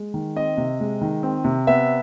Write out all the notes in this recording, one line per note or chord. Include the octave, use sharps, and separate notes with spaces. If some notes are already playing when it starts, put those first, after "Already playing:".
Already playing: G#3
D#3
C4 D#5
C3
G#3
D#3
C4
C3
B3 E5